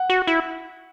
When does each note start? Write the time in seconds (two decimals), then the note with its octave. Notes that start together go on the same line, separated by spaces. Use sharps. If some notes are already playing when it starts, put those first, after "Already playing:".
Already playing: F#5
0.10 F#4
0.27 E4